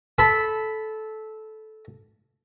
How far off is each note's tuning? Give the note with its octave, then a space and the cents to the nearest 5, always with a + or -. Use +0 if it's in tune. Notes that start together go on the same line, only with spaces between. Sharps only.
A4 -15 B5 +0